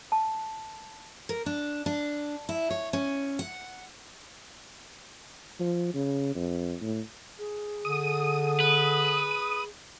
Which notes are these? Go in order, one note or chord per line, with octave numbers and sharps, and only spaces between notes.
A5
A#4
D4
D4
E4
C#5
C#4
F#5
F3
C#3
F2
A2
G#4
D3 D#6
B4